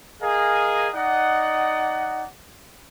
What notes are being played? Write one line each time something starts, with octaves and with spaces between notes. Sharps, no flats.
G#4 A#4 D#5 F5 G#5
D#4 D5 D#5 F#5